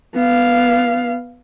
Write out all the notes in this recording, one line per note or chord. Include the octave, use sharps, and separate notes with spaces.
B3 F5